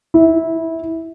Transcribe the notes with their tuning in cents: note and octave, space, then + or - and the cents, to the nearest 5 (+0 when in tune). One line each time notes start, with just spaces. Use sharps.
E4 -15